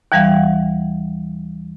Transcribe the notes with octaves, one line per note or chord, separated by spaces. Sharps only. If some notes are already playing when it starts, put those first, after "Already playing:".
D#2 E3 G3 F5 F#5